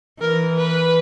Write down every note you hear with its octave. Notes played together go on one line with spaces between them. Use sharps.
E3 A#4
B4